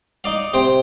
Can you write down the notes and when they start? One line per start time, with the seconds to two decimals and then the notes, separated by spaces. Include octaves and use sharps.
0.24 D#4 D5 F5
0.54 C3 C5 G5